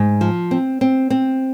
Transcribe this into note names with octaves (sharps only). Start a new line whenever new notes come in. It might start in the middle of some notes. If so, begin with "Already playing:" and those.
Already playing: G#2
F3
C4
C4
C4